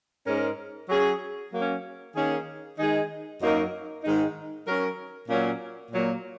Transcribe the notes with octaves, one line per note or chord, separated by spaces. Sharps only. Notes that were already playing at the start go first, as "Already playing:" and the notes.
G#2 G#3 C#4 A#4
F#3 C#4 G#4
F#3 A#3 C#4
D#3 A#3 C#4 G#4
D#3 G#3 D#4 G#4
F#2 F#3 A#3 D#4 A#4
G#2 D#3 G#3 D#4
F#3 C#4 A#4
A#2 F#3 A#3 C#4
A#2 F#3 A#3